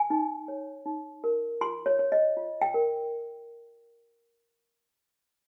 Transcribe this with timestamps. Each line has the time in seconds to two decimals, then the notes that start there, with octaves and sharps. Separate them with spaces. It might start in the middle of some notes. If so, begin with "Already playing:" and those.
Already playing: G#5
0.10 D#4
0.48 C#5
0.86 D#4
1.24 A#4
1.61 F4 C6
1.86 C#5
1.99 C#5
2.12 D#5
2.37 F4
2.62 G5
2.74 A#4